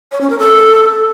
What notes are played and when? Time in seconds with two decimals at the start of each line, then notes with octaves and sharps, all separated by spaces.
0.12 C#5
0.21 C#4
0.30 A#4
0.39 A4